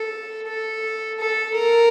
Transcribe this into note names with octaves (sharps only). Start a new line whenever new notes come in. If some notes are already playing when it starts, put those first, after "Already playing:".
Already playing: A4
A4
A4
A#4